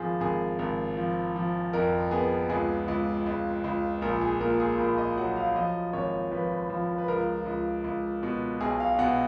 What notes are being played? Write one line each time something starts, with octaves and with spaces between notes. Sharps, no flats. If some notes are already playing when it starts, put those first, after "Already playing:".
Already playing: G#1 F3 G#4
G#1 G#4
G#1
F3
F3
F2 A#4
B3 G#4
C#2 G#4
C#2
C#2
C#2
A#1 A#4
G#4
A#2 A#4
G#4
A#1 A#4
D#5
F#3 F#5
F5
F3 D#5
G#1 C#5
F3 B4
F3
B4
C#2 A#4
C#2
C#2
B2
B1 G#4
F5
B2 F#5